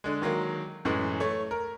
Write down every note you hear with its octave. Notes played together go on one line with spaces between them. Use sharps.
D3 G#3
D#3 F#3 G#3 A#3
F#2 A2 E3 G#3
A3 C#5
A#4